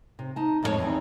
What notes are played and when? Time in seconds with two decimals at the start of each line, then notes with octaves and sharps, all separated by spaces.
0.19 C3
0.36 D#4 A5
0.63 F2 G#3 D4 G4 C#5 A5
0.79 E2 D3 C4 D#4